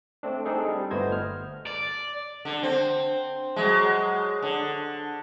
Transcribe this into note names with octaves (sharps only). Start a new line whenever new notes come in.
A3 C4 D4
C4 D4 D#4 G#4 A4
G3
G1 A3 B3 C5 D#5 G#6
F6
D5
D3
C4
F#3 G#3
D3